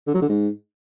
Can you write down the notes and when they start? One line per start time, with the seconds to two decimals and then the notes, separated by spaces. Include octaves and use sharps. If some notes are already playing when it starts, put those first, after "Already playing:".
0.07 D3
0.14 F#3
0.21 D3
0.29 G#2